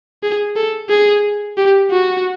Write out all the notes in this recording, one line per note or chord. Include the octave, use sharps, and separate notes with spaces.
G#4
A4
G#4
G4
F#4